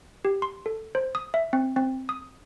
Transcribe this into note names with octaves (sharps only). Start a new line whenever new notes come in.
G4
C6
A4
C5
D#6
E5
C4
C4
D#6